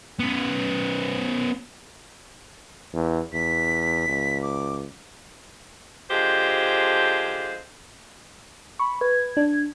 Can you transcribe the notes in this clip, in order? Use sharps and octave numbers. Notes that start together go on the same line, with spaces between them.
B3 C#4
E2
E2 B6
C#2
D6
D3 F3 G#3 F4 G4 C5
B5 C#6
B4 G#6
D4